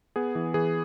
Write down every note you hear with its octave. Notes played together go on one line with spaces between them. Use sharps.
B3 G#4
E3
E3 G#4